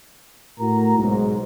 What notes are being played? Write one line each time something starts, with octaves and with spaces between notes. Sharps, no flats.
A2 F#4 A#4 A#5
B1 G#2